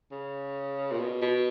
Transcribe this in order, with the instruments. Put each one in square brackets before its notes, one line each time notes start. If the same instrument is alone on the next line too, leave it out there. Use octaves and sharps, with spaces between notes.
[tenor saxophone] C#3
A#2
B2
B2